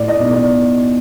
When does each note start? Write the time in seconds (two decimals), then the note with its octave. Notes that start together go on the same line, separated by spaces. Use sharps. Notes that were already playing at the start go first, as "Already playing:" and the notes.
Already playing: A2 D5
0.08 D#5
0.19 B1
0.31 D5